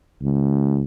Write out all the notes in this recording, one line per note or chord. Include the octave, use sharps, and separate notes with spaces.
C#2